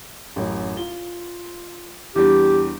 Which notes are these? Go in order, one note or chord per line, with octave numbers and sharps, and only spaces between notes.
A1 F#2 C#5
F4 G7
E2 G3 D4 G4